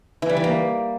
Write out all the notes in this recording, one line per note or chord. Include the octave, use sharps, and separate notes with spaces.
E3
G3
E3
A#3